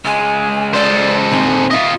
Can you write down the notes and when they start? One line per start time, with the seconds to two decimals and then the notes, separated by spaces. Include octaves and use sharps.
0.05 C#2 G#3 G#5
0.74 A4 C5 D5
1.31 A#2 D#3 C4 G#5
1.71 F4 D#5 E5